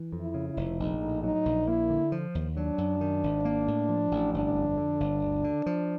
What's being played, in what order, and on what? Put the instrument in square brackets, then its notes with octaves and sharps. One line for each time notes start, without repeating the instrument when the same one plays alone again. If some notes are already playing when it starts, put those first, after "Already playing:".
Already playing: [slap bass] E3
F2
[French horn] E4
[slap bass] C#3
[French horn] E4
[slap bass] F1
[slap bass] A#1 [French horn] D#4
[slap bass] A2
[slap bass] F#3 [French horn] D#4
[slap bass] A#1
[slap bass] A#3 [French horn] E4
[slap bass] D3
F3
D#2
[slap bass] F#3 [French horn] D4
[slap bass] F#2
D#3
G#1
A#3
A2
F3
A1
[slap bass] G1 [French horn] D4
[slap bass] F2
D3
G1
D2
D3
F3